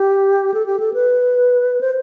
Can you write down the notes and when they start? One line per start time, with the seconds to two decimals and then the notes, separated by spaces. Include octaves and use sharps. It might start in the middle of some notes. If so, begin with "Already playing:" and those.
Already playing: G4
0.54 A4
0.66 G4
0.80 A4
0.94 B4
1.81 C5